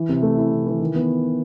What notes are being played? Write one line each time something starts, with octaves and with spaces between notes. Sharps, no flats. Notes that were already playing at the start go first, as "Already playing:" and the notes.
Already playing: E3
C3
A3
E4
C3
E3
D#3
B3